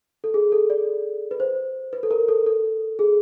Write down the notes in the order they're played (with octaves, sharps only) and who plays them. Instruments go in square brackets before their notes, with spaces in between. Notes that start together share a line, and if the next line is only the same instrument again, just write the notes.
[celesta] A4
G#4
A4
D5
B4
C5
B4
A4
A#4
A4
A4
G#4